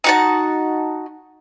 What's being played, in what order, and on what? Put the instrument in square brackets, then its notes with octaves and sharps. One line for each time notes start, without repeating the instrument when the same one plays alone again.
[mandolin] D#4 F#4 A5